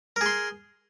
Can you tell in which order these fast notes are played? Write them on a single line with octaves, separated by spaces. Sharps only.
A#4 G#4 C6